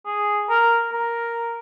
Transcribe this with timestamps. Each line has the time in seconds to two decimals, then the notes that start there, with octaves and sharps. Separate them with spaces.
0.05 G#4
0.50 A#4
0.92 A#4